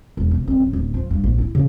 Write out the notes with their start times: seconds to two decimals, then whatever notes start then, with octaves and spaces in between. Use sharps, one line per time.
0.17 E1
0.31 B2
0.48 C4
0.60 A1
0.73 D1
0.94 F3
1.11 G2
1.24 A#1
1.38 E4
1.55 C#3